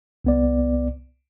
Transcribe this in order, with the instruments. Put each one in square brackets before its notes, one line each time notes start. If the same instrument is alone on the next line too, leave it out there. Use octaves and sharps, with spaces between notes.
[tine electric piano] C2 B3 D5